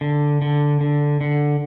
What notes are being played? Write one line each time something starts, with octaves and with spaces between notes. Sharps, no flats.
D3
D3
D3
D3